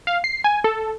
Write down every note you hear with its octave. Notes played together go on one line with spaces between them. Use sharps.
F5
C7
G#5
A4